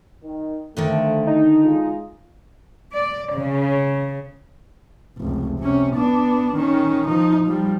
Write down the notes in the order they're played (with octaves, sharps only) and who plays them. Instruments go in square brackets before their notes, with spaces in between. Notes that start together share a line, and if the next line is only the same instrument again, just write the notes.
[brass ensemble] D#3
[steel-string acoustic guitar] D3 D#3 D4 [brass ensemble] F3 A3
[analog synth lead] D#4
[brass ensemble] G#3 F4
[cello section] D5
C#3
[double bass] F1 C#2
C3 C#4
B3 D4
D#3 C#4
F3 D#4
F3 G3